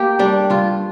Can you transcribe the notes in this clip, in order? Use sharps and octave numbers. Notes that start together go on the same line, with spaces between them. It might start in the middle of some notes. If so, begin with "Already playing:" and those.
Already playing: A#3 G4
G3 D4
G2 F4